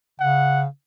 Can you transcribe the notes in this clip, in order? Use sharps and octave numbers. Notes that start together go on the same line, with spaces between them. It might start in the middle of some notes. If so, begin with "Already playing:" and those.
C#3 F#5